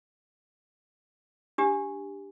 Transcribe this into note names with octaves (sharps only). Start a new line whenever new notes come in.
D4 G4